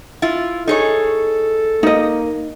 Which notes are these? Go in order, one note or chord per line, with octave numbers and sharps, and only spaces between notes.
E4 F4
D#4 G#4 A4 C#5
A#3 D#4 D#5